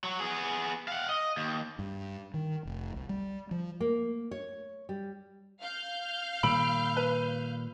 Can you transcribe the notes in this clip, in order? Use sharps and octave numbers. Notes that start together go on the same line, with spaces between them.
F#3
B3 G#4
F5 F#5
D#5
D#2
G2
D#3
F1
C2
G3
F3
A#3
C#5
G3
F5 F6 G6
A#2 D#3 G3 B5 E6 D7 F#7
B4